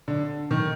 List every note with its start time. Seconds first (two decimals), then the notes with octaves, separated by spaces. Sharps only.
0.08 D3
0.51 D#3